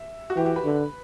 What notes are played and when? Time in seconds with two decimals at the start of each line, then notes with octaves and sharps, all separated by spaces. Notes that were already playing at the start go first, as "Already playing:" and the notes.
Already playing: E5
0.30 F#4
0.36 E3 G4
0.46 G4
0.56 B4
0.65 D3